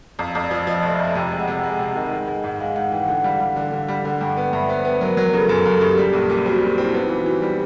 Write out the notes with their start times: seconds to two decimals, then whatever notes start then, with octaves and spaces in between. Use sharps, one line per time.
0.19 F2 F5
0.35 F2
0.43 D5
0.51 F3
0.67 F3 D#5
0.83 F1
0.91 E5
0.99 F2
1.15 C3 G5
1.31 G#3
1.39 F#5
1.48 C3
1.63 G#3
1.79 C3
1.96 D#3
2.12 G#3
2.28 G#3
2.44 G#2
2.60 G#3 F5
2.76 G#2 F#5
2.92 E3 G5
3.08 D3 F#5
3.24 G3 F5
3.40 G3 F#5
3.56 D3 F#5
3.72 D3
3.88 G3
4.05 D3 F#5
4.21 G2 G5
4.37 B3 F#5
4.53 G2 E5
4.69 B3 C5
4.85 B3 B4
5.01 F#3 A#4
5.17 F#3 A#4
5.33 C#3 A4
5.49 F#2 A#4
5.66 F#2 A4
5.81 C#3 G4
5.98 G3
6.13 A#1
6.30 A#2
6.46 C4 F#4
6.62 G3 F#4
6.77 C4 E4
6.94 B3 D#4
7.06 E4
7.09 E3
7.18 F#4
7.26 E3 G4
7.42 G3